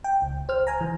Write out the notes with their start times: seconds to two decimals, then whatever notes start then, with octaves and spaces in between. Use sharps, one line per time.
0.04 G5
0.22 C#2
0.49 C5 F6
0.67 G#5 A#5
0.81 E3